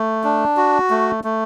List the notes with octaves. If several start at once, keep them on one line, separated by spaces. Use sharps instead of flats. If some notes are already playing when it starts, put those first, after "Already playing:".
Already playing: A3
D4
F#4
A3
A3